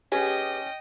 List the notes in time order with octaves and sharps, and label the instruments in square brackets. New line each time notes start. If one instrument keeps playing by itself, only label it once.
[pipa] C#4 [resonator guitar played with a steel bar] G4 G#4 B4 [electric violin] D#5 G5